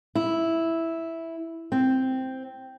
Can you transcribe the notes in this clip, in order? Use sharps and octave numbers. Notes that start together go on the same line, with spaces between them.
E4
C4